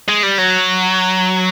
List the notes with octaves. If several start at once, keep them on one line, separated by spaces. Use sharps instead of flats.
G#3
G3
F#3